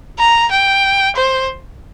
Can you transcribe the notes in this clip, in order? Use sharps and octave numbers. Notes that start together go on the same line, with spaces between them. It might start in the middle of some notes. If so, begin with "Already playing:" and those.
A#5
G5
C5